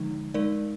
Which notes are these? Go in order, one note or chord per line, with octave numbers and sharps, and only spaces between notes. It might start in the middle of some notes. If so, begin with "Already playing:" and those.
Already playing: D3 F3 G#3 D#4
G#3 D#4 A#4 D5